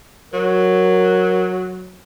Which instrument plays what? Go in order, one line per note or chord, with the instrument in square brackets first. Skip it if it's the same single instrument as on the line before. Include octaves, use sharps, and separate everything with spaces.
[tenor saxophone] F#3 [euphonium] A#4